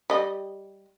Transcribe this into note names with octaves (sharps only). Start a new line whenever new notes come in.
G3 D#5